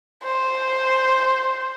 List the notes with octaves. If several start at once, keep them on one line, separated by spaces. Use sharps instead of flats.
C5